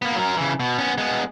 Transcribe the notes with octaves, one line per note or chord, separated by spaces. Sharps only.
A#3 B3
F#3 A#4
C#3 E3
B2
B3 C#4
G#3 B3